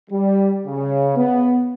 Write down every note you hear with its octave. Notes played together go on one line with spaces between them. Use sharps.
G3
C#3
B3